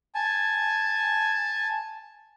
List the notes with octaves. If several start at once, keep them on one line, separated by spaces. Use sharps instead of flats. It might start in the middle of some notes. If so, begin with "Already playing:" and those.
G#5 A5